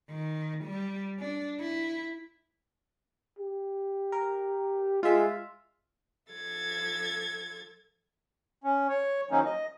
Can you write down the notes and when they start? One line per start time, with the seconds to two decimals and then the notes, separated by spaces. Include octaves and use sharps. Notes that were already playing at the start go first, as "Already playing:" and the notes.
0.10 D#3
0.64 G3
1.19 D4
1.60 E4
3.39 G4
4.12 A#4
5.03 G#3 F4 E5
6.30 F3 A4 G#6 A6
8.64 C#4
8.89 C#5
9.31 D#3 F3 F#3 A#3 C#4 D#4
9.46 D#5